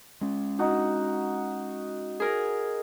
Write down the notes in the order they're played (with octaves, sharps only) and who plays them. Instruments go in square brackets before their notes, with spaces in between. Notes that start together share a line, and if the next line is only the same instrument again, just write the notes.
[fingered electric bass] G#3 C#4
[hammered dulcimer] D#4 F#4
[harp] G#4 A#4